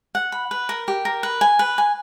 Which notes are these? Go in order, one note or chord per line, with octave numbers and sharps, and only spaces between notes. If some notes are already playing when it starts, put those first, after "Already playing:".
F#5
B5
B4
A#4
G4
A#4
B4
G#5
B4
G#5